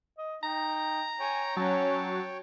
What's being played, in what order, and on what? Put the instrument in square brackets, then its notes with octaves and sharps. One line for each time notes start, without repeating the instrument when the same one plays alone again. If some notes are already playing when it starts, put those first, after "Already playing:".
[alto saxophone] D#5
[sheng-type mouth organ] D#4 [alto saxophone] G5 [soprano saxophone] A#5
[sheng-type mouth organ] C#5 G5 [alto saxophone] G#5
[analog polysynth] F#3 [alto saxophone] C#4 [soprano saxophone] A5